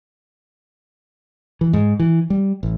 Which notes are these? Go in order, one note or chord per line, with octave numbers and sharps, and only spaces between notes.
E3
G#2
E3
G3
A1